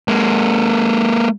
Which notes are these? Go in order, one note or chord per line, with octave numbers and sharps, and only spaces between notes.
G#3 A#3